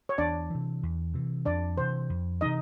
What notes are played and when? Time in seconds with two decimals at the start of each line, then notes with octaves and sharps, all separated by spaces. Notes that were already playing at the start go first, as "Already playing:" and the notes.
0.09 C#5
0.18 E2 D4 D5
0.50 C3 E3
0.83 E2
1.14 C3 E3
1.45 F2 D4 D5
1.77 C3 E3 C5
2.10 F2
2.41 C3 E3 D#4 D#5